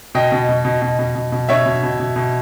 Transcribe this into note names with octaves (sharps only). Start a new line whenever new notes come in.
B2 D#5 G5
B2
B2
B2
B2
B2
B2
B2
B2 C#5 E5
B2
B2
B2
B2